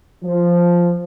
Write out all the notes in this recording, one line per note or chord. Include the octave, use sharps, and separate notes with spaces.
F3